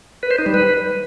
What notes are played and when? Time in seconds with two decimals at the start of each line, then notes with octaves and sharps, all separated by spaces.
0.23 B4
0.31 C5
0.38 D#4
0.46 G3
0.54 B4